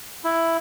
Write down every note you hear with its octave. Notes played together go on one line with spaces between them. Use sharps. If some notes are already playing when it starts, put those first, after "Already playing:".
E4